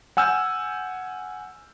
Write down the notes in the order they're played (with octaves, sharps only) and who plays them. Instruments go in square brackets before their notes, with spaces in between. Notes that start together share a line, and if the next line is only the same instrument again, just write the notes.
[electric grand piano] F#5 G#5 E6 F6 G6